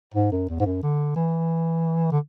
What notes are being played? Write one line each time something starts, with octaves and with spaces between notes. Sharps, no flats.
G#2
F#2
E2
G#2
F#2
D3
E3
D3